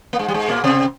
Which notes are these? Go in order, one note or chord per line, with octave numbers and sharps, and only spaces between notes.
A#3
G#2 G#3
G3
G#2 G#3
A#2 A#3
C3 C4